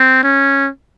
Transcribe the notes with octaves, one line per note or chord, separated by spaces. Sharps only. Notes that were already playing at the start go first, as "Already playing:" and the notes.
Already playing: C4
C#4